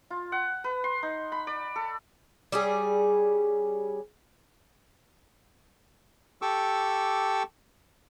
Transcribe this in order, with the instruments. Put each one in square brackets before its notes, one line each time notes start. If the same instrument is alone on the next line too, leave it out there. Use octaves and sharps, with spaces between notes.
[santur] F4
F#5
B4
C6
D#4
B5
D5
A4
[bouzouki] G3 C#4 G#4
[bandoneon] G4 A4 C#6 D6 E6